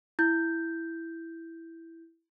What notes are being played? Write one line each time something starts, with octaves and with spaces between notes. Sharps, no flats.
E4 G6